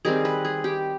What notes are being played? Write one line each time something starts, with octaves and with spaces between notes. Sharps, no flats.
D#3 G3 C4 G#4
B4
G#4
G4